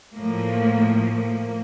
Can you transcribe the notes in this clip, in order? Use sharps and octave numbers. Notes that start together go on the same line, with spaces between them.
A2 F3 A#3
A#3